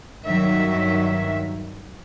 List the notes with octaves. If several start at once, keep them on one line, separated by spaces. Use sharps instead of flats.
G2 D#3 F#3 E5